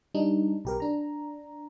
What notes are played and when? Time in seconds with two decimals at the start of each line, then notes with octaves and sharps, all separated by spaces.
0.14 G3 D4 D#4
0.65 B1 G4 A#4
0.80 D4 A#5